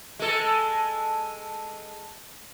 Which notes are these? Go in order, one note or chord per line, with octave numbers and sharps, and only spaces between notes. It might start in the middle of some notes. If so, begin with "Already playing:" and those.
G#3 A4